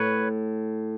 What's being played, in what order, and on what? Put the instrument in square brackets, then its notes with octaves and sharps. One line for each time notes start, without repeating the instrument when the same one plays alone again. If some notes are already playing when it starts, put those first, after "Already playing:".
Already playing: [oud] A2 [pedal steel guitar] B4 C#5